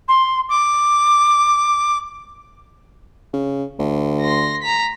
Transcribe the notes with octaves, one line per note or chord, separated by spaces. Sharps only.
C6
D6
C#3
D2
C6 A#6
A#5 B6